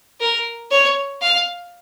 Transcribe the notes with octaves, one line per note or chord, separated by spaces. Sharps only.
A#4
C#5
F5